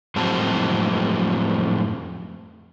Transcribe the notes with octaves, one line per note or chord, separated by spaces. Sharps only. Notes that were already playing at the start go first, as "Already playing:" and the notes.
F2 A2 F#3 G#3 C4 A5